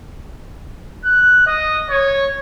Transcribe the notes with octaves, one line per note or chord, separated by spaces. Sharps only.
F#6
D#5
C#5